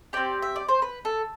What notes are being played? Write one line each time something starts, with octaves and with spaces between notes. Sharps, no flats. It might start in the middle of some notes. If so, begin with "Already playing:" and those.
C4 G4 D5
E5
D5
C5
B4
A4